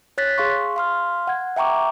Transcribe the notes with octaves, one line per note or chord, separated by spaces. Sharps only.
C#5 F#6 A6 B6
G#4 F5 C6 C#6
F5 C6 F6
F#5 G#6
E5 G5 A#5 C#6 D6